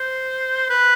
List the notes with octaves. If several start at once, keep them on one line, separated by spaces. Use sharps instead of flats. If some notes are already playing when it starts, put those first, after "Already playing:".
Already playing: C5
B4